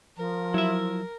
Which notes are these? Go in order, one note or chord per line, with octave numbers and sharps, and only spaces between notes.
F3 A#4
F#3 E4 E5